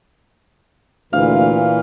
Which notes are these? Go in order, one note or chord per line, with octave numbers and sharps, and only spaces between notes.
D2 A#2 E3 F5